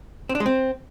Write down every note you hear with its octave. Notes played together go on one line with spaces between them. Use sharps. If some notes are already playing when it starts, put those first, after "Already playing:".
C4
D4
G#3
C4